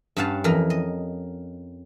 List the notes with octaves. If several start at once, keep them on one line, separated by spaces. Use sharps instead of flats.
G2 C#4 F5 F#5 A5
F2 E3 A#4 A#5
D#5